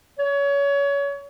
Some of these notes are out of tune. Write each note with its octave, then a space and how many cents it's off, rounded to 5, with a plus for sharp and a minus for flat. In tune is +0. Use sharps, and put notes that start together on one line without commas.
C#5 +25